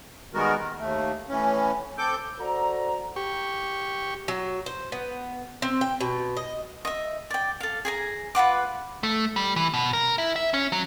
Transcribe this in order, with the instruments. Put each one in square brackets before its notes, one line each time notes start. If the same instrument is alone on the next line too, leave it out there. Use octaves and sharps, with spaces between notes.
[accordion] D#3 G3 G#3 B3 F#4 A#4
D#3
D#2 A3
A2 E3 C#4
C4 A4 D6 G6
[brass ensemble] F#4 A4 C5 D5 A#5
[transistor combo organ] G4 C#6
[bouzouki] F#3
C5
B3
C4
G5
B2
D#5
[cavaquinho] D#5 E5
D5 G5
A4 F5
G#4 G#5 A#5
F4 B4 F#5 D6
[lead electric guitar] A3
G3
E3
B2
A#4
E4
E5
C#4
F#3